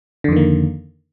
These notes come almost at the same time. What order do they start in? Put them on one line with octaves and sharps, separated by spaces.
D3 F2 D#3 A#3